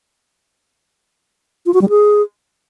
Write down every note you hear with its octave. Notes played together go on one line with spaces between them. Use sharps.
F4
F#4
G3
G#4